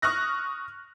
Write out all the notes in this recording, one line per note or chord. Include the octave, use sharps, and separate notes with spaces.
C#6 D#6 F6 F#6 A#6